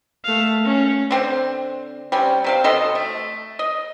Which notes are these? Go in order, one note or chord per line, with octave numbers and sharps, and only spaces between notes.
A3 F5
C#4
D3 C4 C5
G3 C4 C#4
C3 C4 F5
B2 A4 D#5 C6
A3
D#5